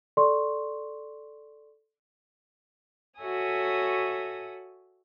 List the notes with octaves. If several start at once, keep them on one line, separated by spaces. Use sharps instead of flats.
A4 D5 C6 C#6
F#4 A4 C#5 E5 G#5 D#6